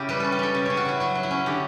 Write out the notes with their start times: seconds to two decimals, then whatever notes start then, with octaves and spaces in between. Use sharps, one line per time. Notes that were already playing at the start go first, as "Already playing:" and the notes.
Already playing: C#3 E4 G4
0.09 G3 B4
0.20 C#4 A4
0.32 G4
0.39 G3 A4
0.54 C#3
0.65 C#3 C#5
0.77 F#4
0.85 C#3 E4
1.00 F#3 F#4
1.15 F#3
1.23 E4
1.31 C#4
1.46 D3 G4